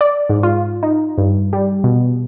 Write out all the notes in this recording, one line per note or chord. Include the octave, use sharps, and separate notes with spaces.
D5
G#2
F4
D#4
G2
G3
B2